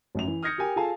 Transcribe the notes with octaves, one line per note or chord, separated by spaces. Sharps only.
A1 F#2 F7
E3
D#6 F6 G6 G#6 A#6 C#7
G4 A#4 G5 G#5
F4 G#4 A4 F5 G#5 A5